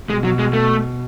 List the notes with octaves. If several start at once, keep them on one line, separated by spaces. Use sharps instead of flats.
B2 G#3
F#3
G#3
A3